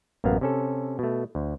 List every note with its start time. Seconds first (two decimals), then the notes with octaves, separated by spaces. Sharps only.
0.24 A1 F#2 A#3 B3 F5
0.41 C3 C#4 A4
0.99 B2 A3
1.35 D2